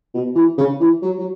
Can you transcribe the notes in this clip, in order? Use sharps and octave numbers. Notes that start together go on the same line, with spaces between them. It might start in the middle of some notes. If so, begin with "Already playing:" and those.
B2
E3
C#3
E3
F#3
F#3